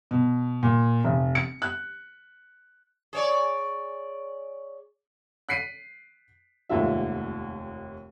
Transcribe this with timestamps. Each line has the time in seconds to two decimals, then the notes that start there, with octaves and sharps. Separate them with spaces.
0.11 B2
0.63 A#2
1.04 F1
1.35 C#7
1.62 F#6
3.13 G#4 C#5 D5
5.49 F#6 B6 C7 D7 D#7
6.69 F1 D#2 G#2 F4 E5